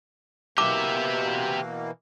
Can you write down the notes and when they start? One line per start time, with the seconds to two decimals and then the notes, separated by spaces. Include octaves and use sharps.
0.58 B2 E3 A#3 G4 E5 D6